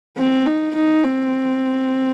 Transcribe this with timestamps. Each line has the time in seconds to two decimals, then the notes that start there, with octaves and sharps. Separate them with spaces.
0.18 C4
0.46 D#4
0.75 D#4
1.04 C4